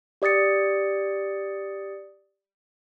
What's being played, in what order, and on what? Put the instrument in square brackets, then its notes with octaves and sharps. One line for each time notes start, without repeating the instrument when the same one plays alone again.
[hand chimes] G4 D5 D#6 A6 C#7